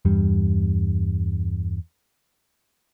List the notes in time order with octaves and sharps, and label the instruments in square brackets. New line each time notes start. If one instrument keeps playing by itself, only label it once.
[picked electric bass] E2 G2 G3